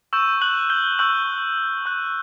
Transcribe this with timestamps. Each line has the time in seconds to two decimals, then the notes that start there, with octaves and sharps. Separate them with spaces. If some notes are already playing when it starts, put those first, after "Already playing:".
0.13 C#6 E6 G6 E7
0.41 F#6 F#7
0.70 G6 G7
0.99 C#6 E6 F#6 G6 F#7
1.86 C#6 F#6